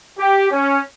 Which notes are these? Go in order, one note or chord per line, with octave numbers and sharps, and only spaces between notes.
G4
C#4